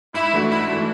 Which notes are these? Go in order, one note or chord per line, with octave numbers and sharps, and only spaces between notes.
G#2 E4
E3 A3 D4 F#4
G#2 E4
E3 A3 D4 F#4